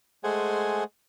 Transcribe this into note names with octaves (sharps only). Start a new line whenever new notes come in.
G#3 A3 G#4 C5 F#5 G#5